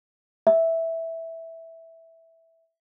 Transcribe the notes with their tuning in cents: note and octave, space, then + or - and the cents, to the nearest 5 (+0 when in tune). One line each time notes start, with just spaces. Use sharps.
E5 -5